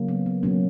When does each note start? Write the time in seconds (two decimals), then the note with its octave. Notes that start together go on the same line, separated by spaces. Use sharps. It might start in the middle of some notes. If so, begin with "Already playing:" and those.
Already playing: C#3 F#3 A#3
0.08 B3
0.26 B3
0.43 B2 F#3 A#3 C#4